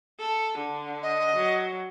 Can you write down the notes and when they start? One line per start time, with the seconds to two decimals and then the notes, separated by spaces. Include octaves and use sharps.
0.20 A4
0.58 D3
1.03 D#5
1.36 F#3